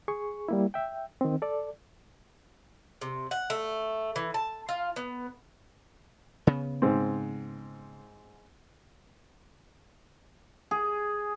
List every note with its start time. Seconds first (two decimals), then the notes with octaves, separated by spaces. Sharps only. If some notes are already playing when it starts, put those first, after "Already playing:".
0.08 G#4 C#6
0.48 G3 A#3 E4
0.74 E5 G5
1.21 D#3 C4
1.42 A4 D5
3.01 C3
3.31 F#5
3.50 A3
4.16 E3
4.34 A5
4.69 F4
4.96 B3
6.47 C#3 B3
6.82 G#2 C4
10.71 G#4